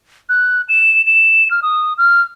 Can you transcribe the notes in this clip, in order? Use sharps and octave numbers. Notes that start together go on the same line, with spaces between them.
F#6
E7
E7
F6
D#6
F6